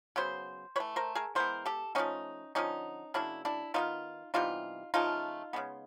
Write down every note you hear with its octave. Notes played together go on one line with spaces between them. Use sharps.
C#3 F#3 B3 C5
E3 A3 B4 C#5
A#4 C5
G#4 A#4
E3 G#3 B3 A#4 C5
G4 A4
C#3 F3 A3 C#4 D#4
D3 F3 A3 C#4 D#4
C#3 F#3 A#3 D4 E4
D4 E4
D#3 G3 B3 D#4 F4
C3 E3 G3 B3 D#4 F4
C#3 F3 A3 D#4 F4
C#3 F3 G#3 B3